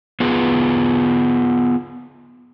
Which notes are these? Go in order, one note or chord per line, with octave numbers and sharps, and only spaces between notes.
B3 F4 G#4